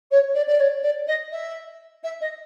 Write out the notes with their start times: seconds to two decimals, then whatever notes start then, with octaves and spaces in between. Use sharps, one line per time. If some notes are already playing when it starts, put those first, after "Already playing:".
0.11 C#5
0.34 D5
0.47 D5
0.59 C#5
0.83 D5
1.07 D#5
1.31 E5
2.03 E5
2.21 D#5